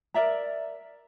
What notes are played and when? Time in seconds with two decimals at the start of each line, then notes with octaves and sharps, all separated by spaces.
0.14 A#4 D5 E5 A#5